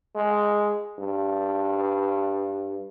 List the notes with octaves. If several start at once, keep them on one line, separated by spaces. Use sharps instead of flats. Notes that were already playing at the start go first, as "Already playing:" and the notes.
G#3
G2